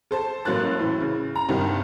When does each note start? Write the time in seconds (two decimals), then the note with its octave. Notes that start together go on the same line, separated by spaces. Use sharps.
0.11 A4 C5 A5
0.45 A1 F#3 A#3 C5 F#6 A6
0.79 A2 E3
1.01 C#3
1.36 A#5
1.49 C2 G2 D#3